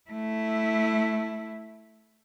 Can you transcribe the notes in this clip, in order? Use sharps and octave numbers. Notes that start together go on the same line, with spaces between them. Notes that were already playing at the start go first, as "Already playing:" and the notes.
A3 E4